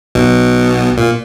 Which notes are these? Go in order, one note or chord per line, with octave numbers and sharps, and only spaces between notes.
B1 B2
A#2